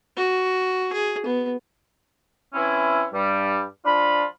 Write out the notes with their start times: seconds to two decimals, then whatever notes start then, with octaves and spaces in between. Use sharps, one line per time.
0.17 F#4
0.92 G#4
1.26 B3
2.54 E3 C4 C#4 E4
3.12 G2 G3
3.84 F3 D4 F4 B5